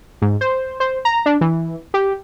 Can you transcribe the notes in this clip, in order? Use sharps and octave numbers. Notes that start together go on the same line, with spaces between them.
G#2
C5
C5
A#5
D4
E3
G4